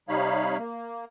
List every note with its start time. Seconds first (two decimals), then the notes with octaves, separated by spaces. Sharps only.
0.09 C3 G3 D#4 C#5 F5 B5
0.59 A#3